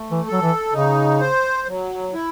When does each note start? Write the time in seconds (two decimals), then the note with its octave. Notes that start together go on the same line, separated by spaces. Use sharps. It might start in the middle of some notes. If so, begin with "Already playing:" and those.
Already playing: A3
0.11 E3
0.26 A4
0.32 F#3
0.42 E3
0.73 C#3 D#4
1.20 C5
1.68 F#3
2.14 E4